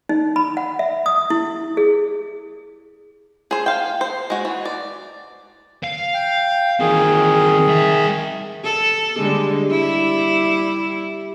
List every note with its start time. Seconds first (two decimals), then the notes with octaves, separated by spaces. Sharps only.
0.09 D#4
0.36 B5
0.57 F#5
0.79 E5
1.06 D#6
1.30 E4
1.77 G#4
3.51 G#4 C5
3.66 F5 G5
4.01 C5
4.30 G#3 F#4
4.45 E3
4.65 D5
5.83 F5
6.14 G5
6.80 D#3 E3 C4 G#4
7.68 G3 E5
8.64 A4
9.17 D3 G3 G#3
9.71 G3 E4